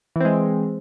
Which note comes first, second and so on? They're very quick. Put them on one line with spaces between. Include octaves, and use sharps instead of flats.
E3 C4 G#3